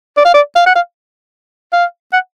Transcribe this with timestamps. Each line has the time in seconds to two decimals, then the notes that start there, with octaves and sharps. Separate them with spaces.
0.17 D5
0.25 F5
0.34 D5
0.56 F5
0.66 F#5
0.76 F5
1.73 F5
2.13 F#5